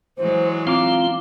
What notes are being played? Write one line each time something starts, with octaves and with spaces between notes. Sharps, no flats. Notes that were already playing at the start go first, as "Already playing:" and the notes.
E3 F#3 G#3 C5
C4 F4 F5 A#5 D6